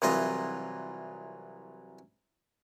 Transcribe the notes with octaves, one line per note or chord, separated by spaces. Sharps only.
C2 E3 F#3 F4 D#5